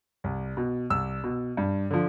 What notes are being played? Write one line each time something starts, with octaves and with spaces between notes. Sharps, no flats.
C2
B2
C2 E6
B2
G2
D3 F3